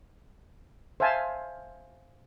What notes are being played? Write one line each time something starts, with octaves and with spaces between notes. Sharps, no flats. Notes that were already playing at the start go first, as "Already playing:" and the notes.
C5 E5 F5 G#5 A5